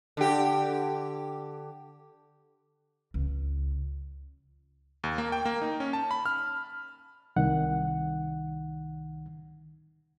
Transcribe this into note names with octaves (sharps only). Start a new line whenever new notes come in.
D3 G4
C#2
D#2
A#3
G5
A#3
D#4
C#4
A5
B5
F6
C2 D#3 F#5